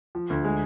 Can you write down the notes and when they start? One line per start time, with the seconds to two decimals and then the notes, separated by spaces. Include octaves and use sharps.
0.15 F3
0.30 D2
0.45 G#3